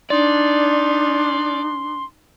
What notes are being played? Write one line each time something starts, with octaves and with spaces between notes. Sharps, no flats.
D4 D#4 D5 C6